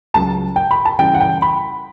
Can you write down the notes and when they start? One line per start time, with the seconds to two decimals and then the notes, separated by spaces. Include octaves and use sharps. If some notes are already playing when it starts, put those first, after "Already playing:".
0.14 C#2 C#3 F#3 A5
0.56 G5
0.71 B5
0.85 A5
0.99 C#3 E3 G3 G5
1.14 F#5
1.20 G5
1.42 B5